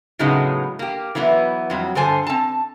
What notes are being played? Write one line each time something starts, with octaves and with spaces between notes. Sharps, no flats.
A2 C#3 F#3 G#3 B3 D#4
A#3 G4
E3 F#3 B3 E4
F2 F#3 G3
G2 D3 A4 C5 G#5 A5
C4 A5